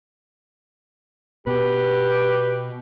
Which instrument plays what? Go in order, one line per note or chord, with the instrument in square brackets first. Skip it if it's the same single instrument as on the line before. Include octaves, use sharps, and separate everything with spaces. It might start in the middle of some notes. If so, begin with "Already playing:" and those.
[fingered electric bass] B2 [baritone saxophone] G4 [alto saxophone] B4